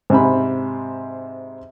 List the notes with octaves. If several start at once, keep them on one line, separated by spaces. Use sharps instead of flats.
G#2 C3 B5